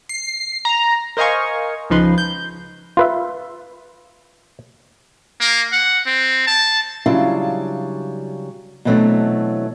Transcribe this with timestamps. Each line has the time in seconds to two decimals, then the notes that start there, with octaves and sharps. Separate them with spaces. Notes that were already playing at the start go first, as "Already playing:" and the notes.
0.09 C7
0.65 A#5
1.17 A#4 C5 D#5 F5 G#5 C#6
1.90 C#2 C#3 F3 D#4 B4 C6
2.18 G6
2.97 F4 B4 E5
5.41 A#3
5.73 F#5
6.06 C4
6.47 A5
7.06 C#3 F#3 G3 D4 E4 F4
8.85 B2 E3 F#3 A3 C4 D4